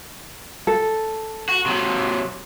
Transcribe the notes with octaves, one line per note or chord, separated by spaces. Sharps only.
A4
F#4
C3 F#3